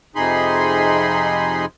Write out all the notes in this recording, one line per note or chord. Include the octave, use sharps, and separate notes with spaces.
F2 C3 D#4 G#4 B5 C6